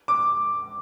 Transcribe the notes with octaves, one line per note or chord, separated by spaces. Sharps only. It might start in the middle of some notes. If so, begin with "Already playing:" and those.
D6